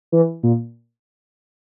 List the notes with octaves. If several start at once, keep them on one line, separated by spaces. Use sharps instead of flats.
E3
A#2